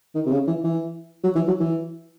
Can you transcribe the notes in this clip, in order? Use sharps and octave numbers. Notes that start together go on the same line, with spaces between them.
D#3
C3
C#3
E3
E3
F#3
E3
F#3
E3